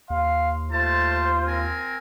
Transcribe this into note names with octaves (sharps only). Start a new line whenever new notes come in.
D#2 F5 C6
A3 F4 C5 A5
C4 A#4 G#5